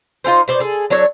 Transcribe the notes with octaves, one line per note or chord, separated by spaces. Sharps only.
D#4 F4 A4 C5
B2 C5 D5
G#4 A4
F#3 D4 A4 C#5